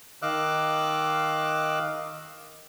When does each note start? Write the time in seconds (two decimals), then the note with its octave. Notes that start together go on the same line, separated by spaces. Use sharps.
0.22 D#3 D#5 F5 D6 E6 F#6